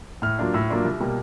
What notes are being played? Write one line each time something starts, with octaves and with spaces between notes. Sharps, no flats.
A2 F6
F#3 A#3 D4 F4
A2 E6
F#3 A#3 D4 F4
C2
B2 G3 A#3